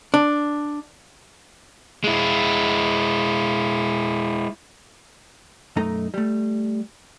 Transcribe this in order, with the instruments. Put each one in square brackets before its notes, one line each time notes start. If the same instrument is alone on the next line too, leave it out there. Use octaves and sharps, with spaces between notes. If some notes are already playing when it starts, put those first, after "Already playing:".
[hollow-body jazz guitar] D4
[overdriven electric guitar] G#3 E4
[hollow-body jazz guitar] B1 F#2 A3 D#4 A#5
G3 A3